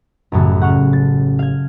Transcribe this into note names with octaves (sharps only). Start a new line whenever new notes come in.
A1 F#2 A2 C#3
F#5 C#6 F6
A6
F5 G#6